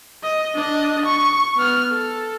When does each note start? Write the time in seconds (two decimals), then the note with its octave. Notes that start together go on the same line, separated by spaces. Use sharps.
0.23 D#5
0.55 D4 D#5
1.05 C#6
1.56 B3 F6
1.92 A4